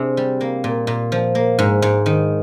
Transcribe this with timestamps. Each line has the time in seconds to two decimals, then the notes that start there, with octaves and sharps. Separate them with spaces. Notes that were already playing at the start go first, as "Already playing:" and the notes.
Already playing: C3 D4 G#4
0.17 G3
0.41 A#3
0.64 A#2
0.87 A#2
1.12 F3
1.35 A#3
1.59 G#2
1.82 G#2
2.06 D#3